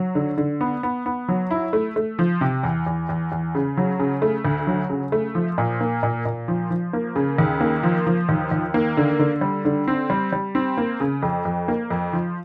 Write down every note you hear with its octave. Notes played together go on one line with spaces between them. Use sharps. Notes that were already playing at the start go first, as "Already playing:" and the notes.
Already playing: F#3
D3
D3
B3
B3
B3
F#3
E4
A3
A3
F3
C3
E2
E2
E2
E2
C#3
F#3
C#3
A3
D2
F#3
C#3
A3
F3
A#2
A#3
A#2
A#2
F3
F3
A#3
C#3
D#2
A#3
F3
F3
D#2
D#2
A#3
D3
D3
G3
D3
C4
G3
G3
C4
A#3
C#3
F2
F2
A#3
F2
F3